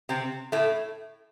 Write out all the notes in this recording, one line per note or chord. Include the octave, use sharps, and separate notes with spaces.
C3 C4
A2 A3